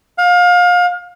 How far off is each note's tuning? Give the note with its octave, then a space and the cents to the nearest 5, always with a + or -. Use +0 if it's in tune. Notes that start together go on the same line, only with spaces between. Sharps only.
F5 +30